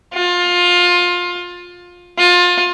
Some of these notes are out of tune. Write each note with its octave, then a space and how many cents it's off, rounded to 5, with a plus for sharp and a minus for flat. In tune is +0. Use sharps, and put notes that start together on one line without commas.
F4 +20
F4 +25